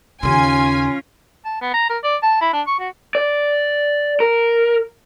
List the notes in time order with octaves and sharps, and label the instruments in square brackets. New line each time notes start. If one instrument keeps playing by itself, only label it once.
[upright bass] D#2 C#3 [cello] C#4 F4 [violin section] G#5 [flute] C6
[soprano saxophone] A5
B3
A#5
A#4
D5
A5
E4
D4
C#6
F#4
[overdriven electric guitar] D5
A#4